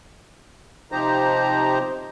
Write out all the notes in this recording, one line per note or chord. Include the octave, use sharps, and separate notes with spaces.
C3 F3 D#4 G4 C5 A#5